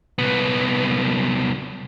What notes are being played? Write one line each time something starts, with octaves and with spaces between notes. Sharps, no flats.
C2 B3